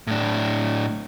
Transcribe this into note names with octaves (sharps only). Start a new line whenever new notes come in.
A2 D4